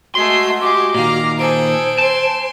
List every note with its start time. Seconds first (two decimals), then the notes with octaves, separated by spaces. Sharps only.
0.15 G#3 A3 F#4 C6 C7
0.61 G#3 G4 D6
0.95 A#2 D#3 F5 A#5
1.39 G#4 A4 C5 D7
1.98 G#5 A5 C6